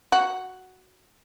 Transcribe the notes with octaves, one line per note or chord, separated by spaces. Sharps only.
F#4